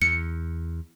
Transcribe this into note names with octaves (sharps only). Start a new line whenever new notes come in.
E2 C#7